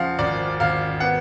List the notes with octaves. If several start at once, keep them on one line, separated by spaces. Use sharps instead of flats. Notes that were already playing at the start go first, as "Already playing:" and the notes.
Already playing: C#3 F3 F5 F#5
G#1 D5
G#1 F5
B3 F#5